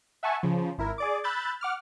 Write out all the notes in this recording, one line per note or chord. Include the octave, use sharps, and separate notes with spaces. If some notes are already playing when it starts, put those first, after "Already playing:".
E5 F#5 G#5 A5 C#6
C#3 F3
G#1 E4 A#4
G#4 D5 D6
B5 E6 F#6 G6 A6
F#5 D6 F6